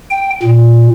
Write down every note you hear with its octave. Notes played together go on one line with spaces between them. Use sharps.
G5
A#2